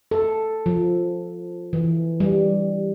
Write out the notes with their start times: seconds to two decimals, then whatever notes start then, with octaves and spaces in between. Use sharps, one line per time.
0.11 A4
0.66 F3
1.73 E3
2.20 G3